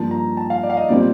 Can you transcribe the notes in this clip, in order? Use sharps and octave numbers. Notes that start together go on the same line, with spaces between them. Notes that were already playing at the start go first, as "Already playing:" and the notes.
Already playing: G2 F3 A#3 A5
A#5
A5
F5
D5
F5
D#5
A#2 G3 C4 D5